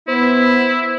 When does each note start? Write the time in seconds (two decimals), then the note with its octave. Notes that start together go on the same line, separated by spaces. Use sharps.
0.08 B3 E4 C5